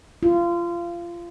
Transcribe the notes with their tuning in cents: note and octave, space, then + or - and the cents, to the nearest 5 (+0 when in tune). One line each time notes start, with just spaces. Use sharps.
F4 -25